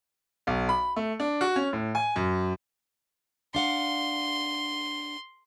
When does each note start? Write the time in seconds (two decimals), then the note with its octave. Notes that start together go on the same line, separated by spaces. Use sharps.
0.47 B1
0.69 B5
0.96 A3
1.20 D4
1.41 F#4
1.56 C#4
1.73 A2
1.95 G#5
2.16 F#2
3.55 D4 F5 F#5 C6